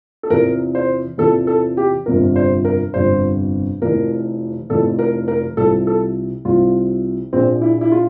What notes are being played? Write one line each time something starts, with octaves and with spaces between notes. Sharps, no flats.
A4
E2 C3 F3 A#4
C5
E2 C3 F3 A4
A4
G4
G1 F2 C3 F3 A#4
C5
A#4
G1 F2 C3 F3 C5
F1 F2 E3 A#4
F1 F2 E3 A4
A#4
A#4
C2 C3 F3 A4
A4
C2 C3 F3 F4
A#1 A#2 F3 C4
E4
E4
F4